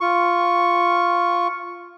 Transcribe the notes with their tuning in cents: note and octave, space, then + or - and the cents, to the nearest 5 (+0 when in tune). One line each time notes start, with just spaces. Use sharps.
F4 +0 C#6 +0